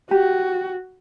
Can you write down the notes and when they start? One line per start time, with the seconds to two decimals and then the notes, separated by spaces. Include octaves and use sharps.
0.11 F#4 G4